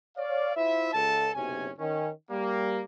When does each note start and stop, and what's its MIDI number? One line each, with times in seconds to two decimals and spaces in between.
0.17 0.53 73
0.17 0.53 74
0.17 0.53 77
0.56 0.93 64
0.56 0.93 65
0.56 0.93 72
0.56 0.93 76
0.93 1.29 37
0.93 1.29 69
0.93 1.29 81
1.34 1.69 30
1.34 1.69 35
1.34 1.69 48
1.34 1.69 61
1.34 1.69 80
1.79 2.09 51
1.79 2.09 61
2.30 2.81 55
2.30 2.81 58